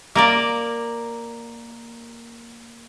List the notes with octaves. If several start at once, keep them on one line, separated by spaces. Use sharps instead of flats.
A#3 A#4 D5